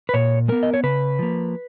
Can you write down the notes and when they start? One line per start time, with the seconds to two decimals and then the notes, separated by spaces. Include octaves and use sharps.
0.09 B4
0.14 A#2 C#5
0.48 G#3 B3 A#4
0.63 D#5
0.74 C#5
0.83 C#3 B4
1.19 F3 A#3